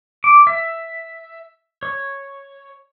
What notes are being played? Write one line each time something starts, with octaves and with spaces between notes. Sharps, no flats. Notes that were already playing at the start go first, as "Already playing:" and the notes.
D6
E5
C#5